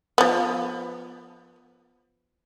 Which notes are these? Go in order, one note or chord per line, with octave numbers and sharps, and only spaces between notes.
F3 B3